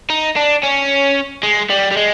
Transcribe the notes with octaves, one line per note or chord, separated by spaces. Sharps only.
D#4
D4
C#4
G#3
G3
G3
G#3